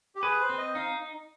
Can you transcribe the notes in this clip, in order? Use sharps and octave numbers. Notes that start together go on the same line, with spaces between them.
G4
G#4 B4
C5
C4
D#5
D#4 F5